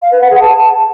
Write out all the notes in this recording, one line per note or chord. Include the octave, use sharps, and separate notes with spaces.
F5
B4
F#5
G#4
A5